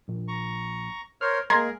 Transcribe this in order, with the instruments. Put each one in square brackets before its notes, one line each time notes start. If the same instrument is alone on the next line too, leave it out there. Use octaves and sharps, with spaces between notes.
[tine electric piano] A#1
[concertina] A#5 C#6
[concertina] A#4 C5 C#5 [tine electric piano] F6
[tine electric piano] G#3 A#3 [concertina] G#4 A#4 [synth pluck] A#5 C6 G#6